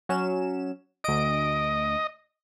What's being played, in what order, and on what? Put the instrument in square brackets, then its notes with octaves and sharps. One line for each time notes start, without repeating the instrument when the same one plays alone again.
[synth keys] F#3 C#4 E7
[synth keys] D2 D7 [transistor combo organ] D#5